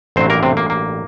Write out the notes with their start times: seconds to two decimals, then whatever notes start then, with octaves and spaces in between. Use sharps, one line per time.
0.16 A1 G2 F#3 C4 C5
0.30 A#3 A#4
0.43 C3 C4
0.57 A#3
0.70 A#3